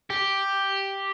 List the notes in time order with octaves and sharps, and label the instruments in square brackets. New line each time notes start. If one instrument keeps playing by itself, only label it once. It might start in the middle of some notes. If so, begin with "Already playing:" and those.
[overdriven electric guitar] G4